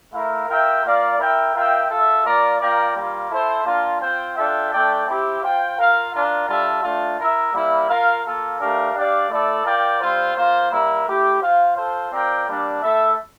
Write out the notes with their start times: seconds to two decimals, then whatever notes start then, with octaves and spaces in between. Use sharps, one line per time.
0.13 A3 E4 A#4 F5
0.48 F4 A#4 E5 G5
0.84 A#3 F4 A#4 D5 F5
1.18 E4 A#4 E5 G5
1.54 F4 A#4 E5 G5
1.89 F4 A4 E5
2.25 A#3 F4 A#4 D5
2.60 A#3 F4 A#4 D5 G5
2.95 G3 A#3 F4
3.30 E4 A4 C5
3.65 A#3 D4 F4
4.01 C4 F4 C5 G5
4.36 D4 F4 A4 E5 G5
4.71 A3 D4 A4 D5 G5
5.07 C4 E4 G4
5.42 F4 C5 G5
5.77 F4 A#4 F5
6.12 D4 F4 A#4
6.47 G3 D4 F4 A4 E5
6.83 A3 D4 F4
7.18 E4 A#4 E5
7.53 G3 A#3 E4
7.89 F4 A#4 F5
8.24 A#3 F4 A4
8.59 A3 D4 G4 A#4 F5
8.95 D4 G4 D5 F5
9.30 A3 E4 A4 D5
9.65 F4 A#4 D5 G5
10.01 G3 C4 F4 C5
10.36 A#3 F4 C5 F5
10.70 G3 A#3 E4 A#4
11.06 A3 E4 G4
11.41 F4 C5 F5
11.76 F4 A4 C5
12.12 C4 F4 A#4 D5 G5
12.48 G3 A#3 D4
12.82 A3 E4 A4 E5